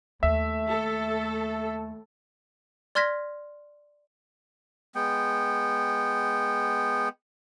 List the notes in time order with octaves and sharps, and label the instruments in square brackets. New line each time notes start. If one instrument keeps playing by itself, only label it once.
[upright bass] D#2 [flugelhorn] A3 [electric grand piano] E5
[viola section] A4
[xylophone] D5 C6 F6 G#6 A#6 B6
[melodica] G#3 B3 G5